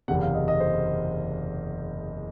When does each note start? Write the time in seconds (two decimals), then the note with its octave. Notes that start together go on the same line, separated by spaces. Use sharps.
0.08 F#1 E2 C3 F#5
0.21 F5
0.34 D#5
0.48 D#5
0.60 C5